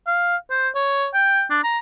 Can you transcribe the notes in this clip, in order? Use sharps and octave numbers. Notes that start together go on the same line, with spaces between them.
F5
C5
C#5
G5
D4
A#5